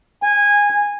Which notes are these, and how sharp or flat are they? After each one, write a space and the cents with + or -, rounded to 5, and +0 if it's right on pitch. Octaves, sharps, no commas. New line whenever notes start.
G#5 -15